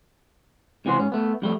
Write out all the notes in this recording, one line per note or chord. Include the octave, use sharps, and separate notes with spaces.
C#2 C3 E3 F#4 C5
G#2 C#4
A3 B3
F2 G3 A3